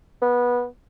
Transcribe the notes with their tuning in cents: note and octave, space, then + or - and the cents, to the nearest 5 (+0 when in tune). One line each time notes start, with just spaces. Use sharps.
B3 -20